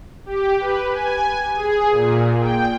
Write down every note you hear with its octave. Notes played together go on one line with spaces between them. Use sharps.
G4
B4
G#5
G#4
A#2
G5